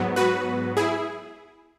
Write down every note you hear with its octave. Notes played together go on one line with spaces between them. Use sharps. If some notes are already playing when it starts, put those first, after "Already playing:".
Already playing: G#2 F#3 B3
F#4 B4
E4 G#4